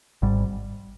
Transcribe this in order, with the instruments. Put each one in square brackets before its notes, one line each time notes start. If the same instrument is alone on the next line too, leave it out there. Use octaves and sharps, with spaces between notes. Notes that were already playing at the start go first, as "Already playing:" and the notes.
[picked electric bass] G#1 G#2 G3